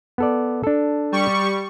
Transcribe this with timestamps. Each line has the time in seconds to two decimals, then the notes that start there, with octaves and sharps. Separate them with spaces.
0.18 B3 A4 D5
0.63 D4 A4
1.12 G3 C#6